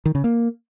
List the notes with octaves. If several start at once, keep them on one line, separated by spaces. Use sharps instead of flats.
D#3
C#3
A#3